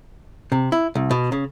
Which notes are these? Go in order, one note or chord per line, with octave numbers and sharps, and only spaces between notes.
C3
E4
C2
B2
C#3